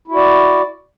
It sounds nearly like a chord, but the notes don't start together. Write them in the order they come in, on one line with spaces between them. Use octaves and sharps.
E4 F#4 D5